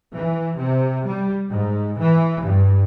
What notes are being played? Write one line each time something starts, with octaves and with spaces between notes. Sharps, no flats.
E3
C3
G3
G#2
E3
G2